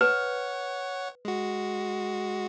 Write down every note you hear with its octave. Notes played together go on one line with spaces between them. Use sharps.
B4 C#5 F#5
G#3 F#4